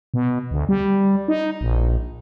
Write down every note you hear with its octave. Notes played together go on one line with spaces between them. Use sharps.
B2
D2
G3
D#4
A#1